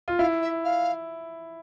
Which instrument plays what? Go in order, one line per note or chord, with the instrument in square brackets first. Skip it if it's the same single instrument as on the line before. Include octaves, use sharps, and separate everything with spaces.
[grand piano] F4
[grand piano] E4 [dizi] F5
[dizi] E5
F5